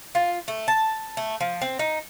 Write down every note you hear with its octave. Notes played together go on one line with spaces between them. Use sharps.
F4
A3
A5
A3
F3
C4
D#4